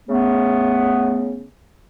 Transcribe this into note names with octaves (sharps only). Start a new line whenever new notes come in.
C#3 A3 B3